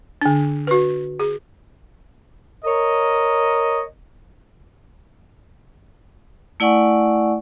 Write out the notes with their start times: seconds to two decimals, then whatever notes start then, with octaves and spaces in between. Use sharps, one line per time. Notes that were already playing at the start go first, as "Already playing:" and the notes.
0.21 D3 D4
0.67 F#4 B4
1.20 G#4
2.64 A#4 C#5 D#5
6.60 A3 E4 D5 F#5 G#5 C#6